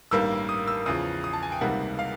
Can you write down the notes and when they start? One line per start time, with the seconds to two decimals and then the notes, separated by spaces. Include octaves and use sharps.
0.11 A1 G2 D#3 G3 A#3 E6
0.49 D#6
0.68 E6
0.86 E2 C#3 F3 D#6
1.24 D#6
1.33 A5
1.43 G#5
1.52 G5
1.61 C#2 C3 D#3 G3 A#3 F#5
1.99 F5